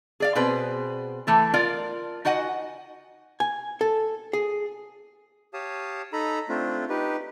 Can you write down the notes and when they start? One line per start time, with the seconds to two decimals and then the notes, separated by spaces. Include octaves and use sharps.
0.20 G#4 D5 F5
0.35 B2 C4 G#4 B4 C5
1.27 E3 A3 A4
1.54 F4 A#4 D5 F5
2.25 D#4 F#4 D#5 F#5 G#5
3.40 G#5
3.81 A4
4.33 G#4
5.53 G4 C#5 F5 A5 D#6
6.13 D#4 A4 A#5 B5
6.49 A3 C4 D4 F4
6.89 D#4 G4 B4